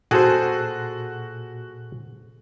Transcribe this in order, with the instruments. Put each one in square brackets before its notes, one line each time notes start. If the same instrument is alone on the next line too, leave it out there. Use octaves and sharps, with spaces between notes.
[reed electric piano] A#2 [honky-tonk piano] F#4 [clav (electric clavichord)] G#4 A4 C5